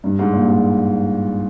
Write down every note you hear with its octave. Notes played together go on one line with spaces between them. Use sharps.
G2
G#2
A#2
G#2